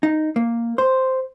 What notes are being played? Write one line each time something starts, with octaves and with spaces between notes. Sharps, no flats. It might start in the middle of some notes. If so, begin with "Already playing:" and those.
D#4
A#3
C5